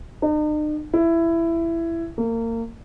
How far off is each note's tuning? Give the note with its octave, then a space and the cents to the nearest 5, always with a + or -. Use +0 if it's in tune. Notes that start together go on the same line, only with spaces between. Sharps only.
D#4 -45
E4 +15
A#3 -30